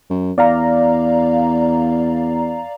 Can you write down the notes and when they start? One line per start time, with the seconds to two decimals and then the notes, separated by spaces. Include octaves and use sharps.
0.10 F#2
0.38 E2 D5 F5 A#5